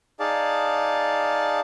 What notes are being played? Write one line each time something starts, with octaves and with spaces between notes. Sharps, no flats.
D#4 G#4 D5 F5 A5